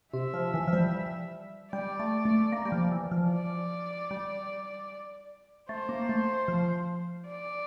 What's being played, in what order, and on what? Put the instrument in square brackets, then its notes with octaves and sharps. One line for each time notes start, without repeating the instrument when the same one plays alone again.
[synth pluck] C3 [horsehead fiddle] E5
[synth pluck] F3
E3
F3
G3
[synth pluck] G3 [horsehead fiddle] D5
[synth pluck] A3
A3
A#3
G3
F3
E3
F3
[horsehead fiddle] D5
[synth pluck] G3
[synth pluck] A3 [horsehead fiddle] C5
[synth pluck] A#3
A3
F3
[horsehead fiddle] D5